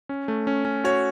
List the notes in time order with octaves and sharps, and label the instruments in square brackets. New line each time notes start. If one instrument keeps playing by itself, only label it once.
[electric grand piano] C#4
A3
C#4
C#4
[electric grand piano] F#4 [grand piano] C#5